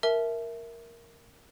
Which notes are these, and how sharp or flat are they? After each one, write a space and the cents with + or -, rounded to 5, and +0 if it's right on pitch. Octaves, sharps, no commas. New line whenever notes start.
A#4 +0 E5 +0 A5 -30